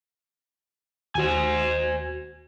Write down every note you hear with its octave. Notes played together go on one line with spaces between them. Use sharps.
D#2 F#4 C5 G#5